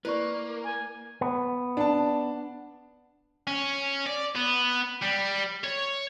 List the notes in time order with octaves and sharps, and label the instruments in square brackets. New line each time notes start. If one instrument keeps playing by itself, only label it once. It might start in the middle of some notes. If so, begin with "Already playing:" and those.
[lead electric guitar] A#3 [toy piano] E4 D5 C#6 [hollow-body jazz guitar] B4
[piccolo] G#5
[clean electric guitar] B3
[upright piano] D4 A5
[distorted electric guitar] C#4
D5
B3
G3
C#5